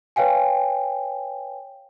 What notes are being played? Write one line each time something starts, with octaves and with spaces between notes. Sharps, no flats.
B4 C#5 F5 G5 G#5